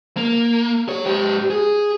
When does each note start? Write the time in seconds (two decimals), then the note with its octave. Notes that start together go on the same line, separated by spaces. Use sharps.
0.17 A#3
0.89 F#3 C#5
1.06 G#2 G4
1.50 G#4